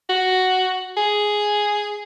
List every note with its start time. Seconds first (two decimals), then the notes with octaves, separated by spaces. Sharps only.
0.09 F#4
0.97 G#4